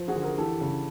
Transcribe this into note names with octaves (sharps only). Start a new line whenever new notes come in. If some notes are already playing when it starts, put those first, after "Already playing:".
Already playing: F3
F#4 G#4
D3
G#4 A#4
E3 G4 A4
C#3